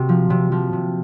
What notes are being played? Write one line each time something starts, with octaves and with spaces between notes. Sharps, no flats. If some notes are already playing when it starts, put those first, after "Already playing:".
Already playing: C3 A#3 F#4
F3
C3
F3
C3